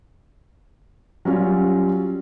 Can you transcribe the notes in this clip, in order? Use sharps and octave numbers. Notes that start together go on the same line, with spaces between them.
F#3 G3 C#4 F4